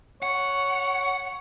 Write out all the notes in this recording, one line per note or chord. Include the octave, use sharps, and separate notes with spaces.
C#5 F#5